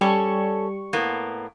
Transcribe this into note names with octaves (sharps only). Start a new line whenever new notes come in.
G3 C#4 A4 C#6
A2 A#3 B3